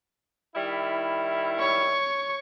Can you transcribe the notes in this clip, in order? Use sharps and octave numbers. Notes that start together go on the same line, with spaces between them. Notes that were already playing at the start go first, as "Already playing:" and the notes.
D#3 G3 E4
C#5 C#6